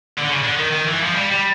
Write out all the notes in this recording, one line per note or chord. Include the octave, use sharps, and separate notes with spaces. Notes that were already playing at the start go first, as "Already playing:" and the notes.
D3
C#3
D3
D#3
D#3
E3
F3
G#3
G3
G3